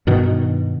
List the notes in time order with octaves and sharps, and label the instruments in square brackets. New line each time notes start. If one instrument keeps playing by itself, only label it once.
[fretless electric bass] G2 B2 D#3